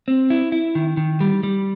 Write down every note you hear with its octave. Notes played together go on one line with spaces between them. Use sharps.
C4
E4
E4
D#3
D#3
G3
G3